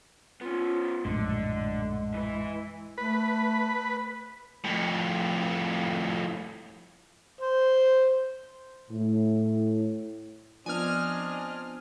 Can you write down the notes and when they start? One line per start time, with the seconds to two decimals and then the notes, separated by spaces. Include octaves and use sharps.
0.41 B3 C#4 F4
1.05 A#1 F#2 A2 D3 G#3
2.14 E3 B4
2.98 A3 B4
4.65 F2 A2
7.41 C5
8.90 A2
10.66 F3 B3 C4 D4 D#5 G#5 F6